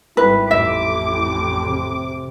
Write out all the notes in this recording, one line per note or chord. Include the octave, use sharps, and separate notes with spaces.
G#1 G3 E4 B4
A1 F2 E5 D6
C3